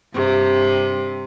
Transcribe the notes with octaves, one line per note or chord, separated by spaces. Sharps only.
G2 C3